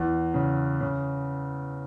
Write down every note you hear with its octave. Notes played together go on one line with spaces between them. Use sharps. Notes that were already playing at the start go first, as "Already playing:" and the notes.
Already playing: E2
C#3
C#3